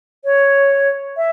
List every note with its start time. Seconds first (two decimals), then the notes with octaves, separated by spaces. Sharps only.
0.25 C#5
1.17 E5